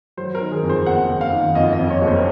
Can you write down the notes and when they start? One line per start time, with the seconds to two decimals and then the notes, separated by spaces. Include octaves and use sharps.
0.17 F#3 C5
0.35 A#4
0.41 D#3
0.52 G#4
0.63 F2
0.69 C5
0.86 F#1 F#5
1.09 F#1
1.21 F5
1.33 D#3
1.55 F2 D#5
1.73 D#5
1.79 F2
1.90 C#5
2.02 F#1
2.07 C5
2.16 A#4